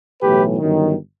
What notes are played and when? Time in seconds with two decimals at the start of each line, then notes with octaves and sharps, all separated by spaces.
0.22 B1 A2 E3 G4 B4
0.58 G1 F#2 D#3